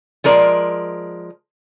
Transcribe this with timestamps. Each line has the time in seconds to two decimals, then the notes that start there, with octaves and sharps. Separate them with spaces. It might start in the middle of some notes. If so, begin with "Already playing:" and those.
0.24 F3 G#3 A#4 D5